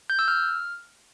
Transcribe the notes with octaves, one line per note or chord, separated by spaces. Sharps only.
G6
E6
F6